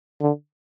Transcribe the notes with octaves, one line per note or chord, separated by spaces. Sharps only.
D3